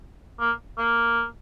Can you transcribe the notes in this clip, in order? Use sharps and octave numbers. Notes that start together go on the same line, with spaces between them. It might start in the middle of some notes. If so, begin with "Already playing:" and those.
A#3
A#3